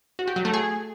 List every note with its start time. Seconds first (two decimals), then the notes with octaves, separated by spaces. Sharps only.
0.19 F#4
0.28 G4
0.36 F#3
0.45 A3
0.54 G#4